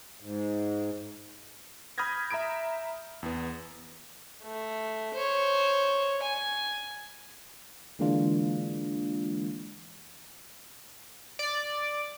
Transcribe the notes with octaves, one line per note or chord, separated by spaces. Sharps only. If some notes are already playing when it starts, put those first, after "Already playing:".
G#2
B5 D#6 F6 G6 G#6 A#6
E5 A#5 B5 D#6 D7
E2 B3
A3
C5 C#5
G#5
D3 E3 G#3 A#3 D4 F4
D5